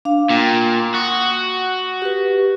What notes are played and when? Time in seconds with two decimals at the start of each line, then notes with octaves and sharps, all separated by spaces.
0.05 D4 F5
0.30 A#2 G5
0.95 F#4 D#6
2.02 G4 B4